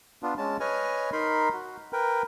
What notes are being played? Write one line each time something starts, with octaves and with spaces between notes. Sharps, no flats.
B3 D4 F4
G#3 C#4 A5
B4 C#5 D#5 G#5 F6
D#4 A#4 B5 C6
F#4
A#4 B4 G5